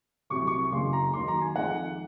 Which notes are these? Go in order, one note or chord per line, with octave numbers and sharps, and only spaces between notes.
C2 C3 F#3 C#6
C#6
F#1 F#2 C#3 G#3 C6
A#5
D#2 D#3 F#3 C6
A#5
G#5
F2 D#3 G#3 F#5